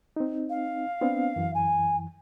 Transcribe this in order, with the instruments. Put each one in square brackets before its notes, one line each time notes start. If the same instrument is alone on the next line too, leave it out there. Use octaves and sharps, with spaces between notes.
[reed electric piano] C4 D#4
[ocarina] F5
[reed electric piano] B3 C4 D4
F#2 E3
[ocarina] G#5